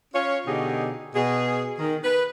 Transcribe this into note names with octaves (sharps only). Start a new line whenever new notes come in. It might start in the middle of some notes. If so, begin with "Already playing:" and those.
C#4 F4 C#5
B2 D3 D#4 G4 G#4
B2 G#4
D#3
B4